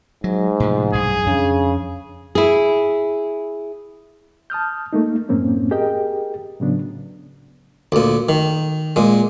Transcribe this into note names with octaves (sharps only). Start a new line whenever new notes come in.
G#2 F#3
A2 C3 F3
B1 G2 G#4
F2 C#3 D4
E4 G#4
A5 D#6 F6 G6
A3 A#3 D#4
F#2 A2 A#3 C4 C#4
G4 G#4 A#4 D#5 G5
A2 C#3 F#3 B3 D4
D2 A#2
D#3
A#2 G#3